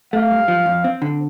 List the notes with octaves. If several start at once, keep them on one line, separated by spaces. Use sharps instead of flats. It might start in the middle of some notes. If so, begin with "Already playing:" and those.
A3 F5
G2
F3
F2
C4
D3